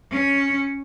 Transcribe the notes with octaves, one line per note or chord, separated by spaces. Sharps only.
C#4